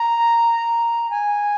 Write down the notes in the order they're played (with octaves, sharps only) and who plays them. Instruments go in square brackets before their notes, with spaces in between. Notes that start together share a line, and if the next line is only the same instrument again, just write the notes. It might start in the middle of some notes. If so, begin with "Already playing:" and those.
Already playing: [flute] A#5
G#5